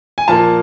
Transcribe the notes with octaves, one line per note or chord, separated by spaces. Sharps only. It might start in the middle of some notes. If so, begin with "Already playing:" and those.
G#5
A#2 F3 A#3 A5